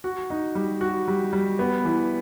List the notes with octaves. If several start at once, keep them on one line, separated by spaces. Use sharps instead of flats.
F#4
D#4
G3
F#4
G3
G3
B3
E3